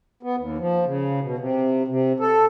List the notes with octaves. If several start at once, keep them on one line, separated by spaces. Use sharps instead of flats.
B3
D#2
F3
C#3
B2
C3
C3
A4